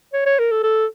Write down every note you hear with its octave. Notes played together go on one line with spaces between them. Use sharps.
C#5
C#5
A#4
A4
A4